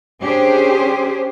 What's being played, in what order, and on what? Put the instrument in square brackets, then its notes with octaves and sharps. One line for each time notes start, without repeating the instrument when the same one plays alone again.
[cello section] C#4 D4 G4 G#4 C5